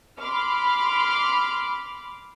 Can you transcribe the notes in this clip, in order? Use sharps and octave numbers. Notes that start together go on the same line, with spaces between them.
B5 C6 D6 F6